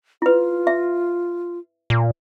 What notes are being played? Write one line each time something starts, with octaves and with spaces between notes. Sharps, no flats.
E4 F4 B4
E5
A#2